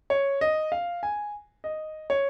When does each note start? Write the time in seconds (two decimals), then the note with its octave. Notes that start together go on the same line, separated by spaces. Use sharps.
0.10 C#5
0.41 D#5
0.72 F5
1.03 G#5
1.64 D#5
2.10 C#5